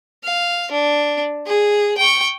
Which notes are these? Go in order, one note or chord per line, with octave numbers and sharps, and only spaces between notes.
F5
D4
G#4
G5 C#6